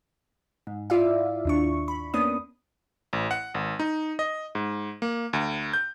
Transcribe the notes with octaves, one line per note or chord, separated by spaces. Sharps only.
G#2
E4 F4 D5 E5 F5
D#2 D4 C#6
B5
A#3 B3 C#4 D4 D#6
A1
F#5
G#1
D#4
D#5
G#2
A#3
D2
G6